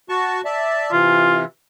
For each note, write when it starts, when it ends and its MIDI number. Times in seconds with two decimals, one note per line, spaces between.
0.09 0.41 66
0.09 0.41 81
0.09 0.41 85
0.45 0.91 74
0.45 0.91 76
0.45 0.91 81
0.92 1.45 48
0.92 1.45 52
0.92 1.41 65